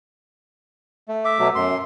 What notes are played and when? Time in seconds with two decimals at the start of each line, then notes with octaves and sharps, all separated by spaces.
1.08 A3
1.25 E5 D6
1.39 B2 F#3 A3
1.55 F#2 C6